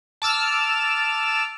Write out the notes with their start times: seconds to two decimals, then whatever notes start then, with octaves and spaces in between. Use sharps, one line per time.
0.22 A5 D6 E6 F6